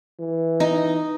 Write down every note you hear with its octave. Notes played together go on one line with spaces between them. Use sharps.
E3
D#4